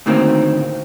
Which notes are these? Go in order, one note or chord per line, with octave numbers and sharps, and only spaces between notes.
D2 A2 D#3 A#3 C4